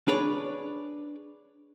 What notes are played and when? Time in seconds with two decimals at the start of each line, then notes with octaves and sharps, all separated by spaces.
0.08 D4 G#4 B4 C#5 D5